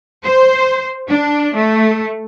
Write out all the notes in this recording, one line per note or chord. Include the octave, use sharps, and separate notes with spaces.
C5
D4
A3